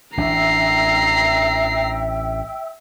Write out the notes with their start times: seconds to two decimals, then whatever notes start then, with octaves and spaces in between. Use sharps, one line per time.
0.17 A1 E3 D4 E5 G5 A#5 E6 C7